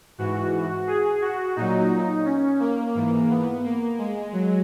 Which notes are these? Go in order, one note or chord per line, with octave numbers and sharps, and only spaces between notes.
G#2 E3 F#4
G#4
F#4
A#2 F#3 D#4
C#4
A#3
G#2 E3
B3
A#3
G#3
F#3